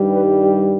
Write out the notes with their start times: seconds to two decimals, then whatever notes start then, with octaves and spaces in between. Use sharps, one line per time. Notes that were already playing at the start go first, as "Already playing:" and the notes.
Already playing: G2 D#3 G3
0.10 B4
0.40 G4